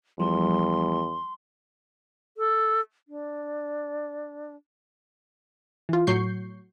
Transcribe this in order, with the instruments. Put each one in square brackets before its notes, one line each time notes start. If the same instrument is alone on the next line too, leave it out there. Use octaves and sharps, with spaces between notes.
[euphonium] E2 [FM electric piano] F3 G3 [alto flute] C6
[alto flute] A4
D4
[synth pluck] E3 F4
A2 F#3 C#6 G6 C7